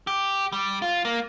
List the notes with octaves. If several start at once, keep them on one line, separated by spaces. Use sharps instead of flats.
G4
G3
F4
A#3